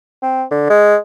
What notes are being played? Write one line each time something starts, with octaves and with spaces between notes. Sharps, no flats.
C4
D3
G#3